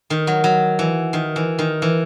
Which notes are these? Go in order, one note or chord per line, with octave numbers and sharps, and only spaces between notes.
D#3
F#3
F#3
E3
D#3
E3
D#3
E3